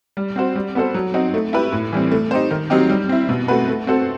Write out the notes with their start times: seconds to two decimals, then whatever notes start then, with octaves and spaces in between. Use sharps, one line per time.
0.17 G3
0.36 C4 F#4 C5
0.56 G3
0.75 B3 F#4 A4 C5
0.94 F#3
1.14 C4 D#4 F#4
1.34 A3
1.53 E4 G4 B4
1.72 A2
1.92 E3 G3 C4
2.11 A3
2.31 D#4 G4 C5
2.51 D#3
2.70 F#3 C4 D#4 G4
2.89 G3
3.09 C4 E4
3.29 B2
3.48 A3 C4 F#4 B4
3.68 A3
3.87 C4 F#4 A4 C5